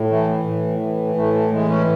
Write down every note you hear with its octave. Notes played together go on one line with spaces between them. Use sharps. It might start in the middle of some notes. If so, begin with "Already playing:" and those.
Already playing: A2
E3 A3
A2
E3
A2 A3
A3
E3 G#3
C#4